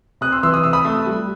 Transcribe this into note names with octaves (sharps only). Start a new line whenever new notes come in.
C3 D#6 F#6
C6 E6
E3 C6 E6
D#6
C3 E6
B5 D#6
A3
G3